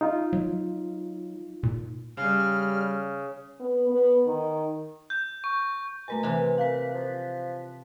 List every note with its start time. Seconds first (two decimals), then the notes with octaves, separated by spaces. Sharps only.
0.01 D#4 F4
0.33 F#3
1.63 A#2
2.17 C#3 G3 F6
3.60 B3
3.90 B3
4.27 D#3
5.10 G6
5.44 C#6
6.08 B2 A3 A#4 G#5
6.23 C3 E3 C4 E5 G#5
6.58 A#3 F5 F#6 B6
6.94 F3